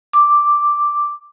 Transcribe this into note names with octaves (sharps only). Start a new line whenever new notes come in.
D6